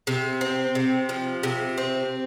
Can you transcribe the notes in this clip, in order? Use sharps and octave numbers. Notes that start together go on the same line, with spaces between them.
C3
C4
C3
F3
C3
C4